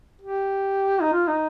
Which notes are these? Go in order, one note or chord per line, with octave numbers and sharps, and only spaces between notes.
G4
D#4
F4
D#4